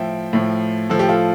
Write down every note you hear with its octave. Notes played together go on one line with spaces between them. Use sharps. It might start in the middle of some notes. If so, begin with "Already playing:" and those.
Already playing: A2 F3 E5 G5
A2 F3
A2 F3 A4
G4
F4 A4